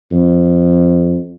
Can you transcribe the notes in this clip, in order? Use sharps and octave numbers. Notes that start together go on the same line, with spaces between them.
F2